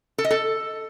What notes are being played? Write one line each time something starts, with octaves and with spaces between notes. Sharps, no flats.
A4
D#5
A4